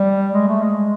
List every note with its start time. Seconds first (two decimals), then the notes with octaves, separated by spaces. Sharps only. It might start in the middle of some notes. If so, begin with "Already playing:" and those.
Already playing: G3
0.33 G#3
0.48 A3
0.62 G#3